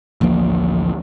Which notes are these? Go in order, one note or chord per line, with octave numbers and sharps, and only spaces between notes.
A1 D2 F3 A#3